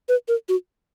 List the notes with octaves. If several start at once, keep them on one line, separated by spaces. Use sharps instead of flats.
B4
A#4
F#4